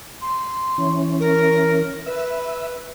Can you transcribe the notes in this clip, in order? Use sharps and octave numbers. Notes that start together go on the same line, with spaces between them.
C6
E3 C#4
A#4
B4 E5